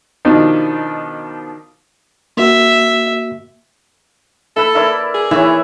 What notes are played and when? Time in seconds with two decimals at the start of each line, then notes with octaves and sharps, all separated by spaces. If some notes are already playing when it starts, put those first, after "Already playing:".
0.25 B2 D#3 F3 D4 D#4
2.37 A#3 F#4 E5
4.56 E4 A4 B4
4.75 E4 A#4 D5
5.14 G#4
5.31 E3 E4 C#5